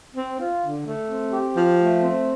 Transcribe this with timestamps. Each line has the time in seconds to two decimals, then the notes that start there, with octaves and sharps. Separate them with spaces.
0.16 C4
0.40 F4
0.63 D3
0.87 A3
1.10 C4
1.32 G4
1.56 F3
1.80 A3
2.03 C4